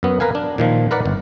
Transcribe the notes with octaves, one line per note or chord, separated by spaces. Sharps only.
F#2 B3
A#4 B4 F5 G#5
D4
A#2 D#3 F3
A#4 B4 D5 F#5
G1